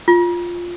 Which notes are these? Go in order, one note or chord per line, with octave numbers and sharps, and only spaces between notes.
F4